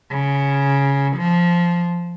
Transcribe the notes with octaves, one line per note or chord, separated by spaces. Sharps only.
C#3
F3